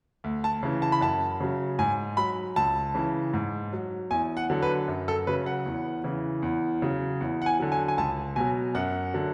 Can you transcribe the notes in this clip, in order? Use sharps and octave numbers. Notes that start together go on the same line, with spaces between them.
D2
A5
C#3 E3
A5
B5
F#2 A5
C#3 F#3
G#2 G#5
F#3 B5
C#2 A5
C#3 E3
G#2
F#3
E2 G#5
F#5
D3 F#3
B4
F#2
A4
C#3 F#3 B4
F#5
E2
C#3 E3
E2
C#3 F#3
E2
F#5
G#5
D3 F#3
G#5
G#5
C#2 A5
B2 F#3 G#5
F#2 F#5
D3 F#3